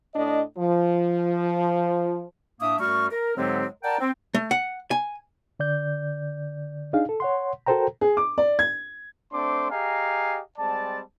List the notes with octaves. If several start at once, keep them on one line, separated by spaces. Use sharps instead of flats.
A2 D4 D#5
F3
A2 A#3 D4 E5 D#6
F#2 G3 A3 F#4 C#6 F6
A#4
G#2 D3 F#3 G#3 C4 G4
A#4 D5 F#5 G5 A5 A#5
C4
A3
F#5
G#5
D3 D5 G6
D4 D#4 G#4 F5
A4
C#5 F#5 C6
F#4 A4 A#4 C5 G5 A#5
G#4
D6
D5
G#6
A3 C4 D4 C5 C6 D6
G4 G#4 D#5 F5 G#5 A#5
G3 G#3 C4 D5 A5